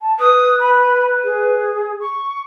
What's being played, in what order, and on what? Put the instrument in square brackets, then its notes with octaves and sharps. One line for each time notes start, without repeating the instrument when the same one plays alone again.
[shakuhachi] A5
[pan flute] B4 [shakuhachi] D#6
[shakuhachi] B5
G#4
C#6